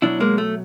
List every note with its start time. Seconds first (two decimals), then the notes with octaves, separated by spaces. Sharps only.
0.02 B2 F#3 D4 E4
0.20 G#3 A#3
0.38 A3